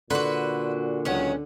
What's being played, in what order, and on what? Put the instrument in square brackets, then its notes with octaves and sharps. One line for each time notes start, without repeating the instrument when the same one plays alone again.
[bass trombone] A#2 [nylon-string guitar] D3 [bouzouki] F#4 B4 [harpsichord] F#5 B5 C6
[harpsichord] C#2 D#3 F#3 [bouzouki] C#4 F#5